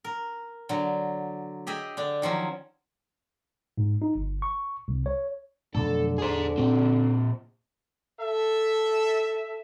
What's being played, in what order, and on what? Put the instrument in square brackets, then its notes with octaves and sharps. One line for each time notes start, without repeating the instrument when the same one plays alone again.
[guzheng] A#4
D3 F#3
G4 G#4 D#5 E5
D3 D4
D#3 F3 F#3 C#4
[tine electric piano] G#2
D#4
G1
C#6
C2
C#5
[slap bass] B1 F2 A3 [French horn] D3 [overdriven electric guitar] A4
[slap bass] E2 [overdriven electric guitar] G#4 C5
[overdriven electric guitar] A#2 C4 [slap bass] C#4
[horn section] A4 E5